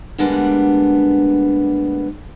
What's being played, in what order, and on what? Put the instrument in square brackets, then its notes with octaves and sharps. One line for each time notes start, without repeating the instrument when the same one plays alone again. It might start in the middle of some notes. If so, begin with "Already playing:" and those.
[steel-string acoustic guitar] D3 G3 G#3 A#3 B3 D4